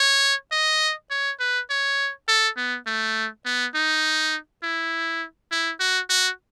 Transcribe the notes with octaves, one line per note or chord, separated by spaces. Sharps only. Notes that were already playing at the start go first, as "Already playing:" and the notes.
Already playing: C#5
D#5
C#5
B4
C#5
A4
B3
A3
B3
D#4
E4
E4
F#4
F#4